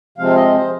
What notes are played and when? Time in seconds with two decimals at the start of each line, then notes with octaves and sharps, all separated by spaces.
0.18 C3 F3 G#3 C4 F5
0.36 D#5
0.54 C5